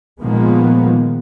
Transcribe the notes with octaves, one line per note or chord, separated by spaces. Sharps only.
A#2 D#3 F3 G#3 A#3 B3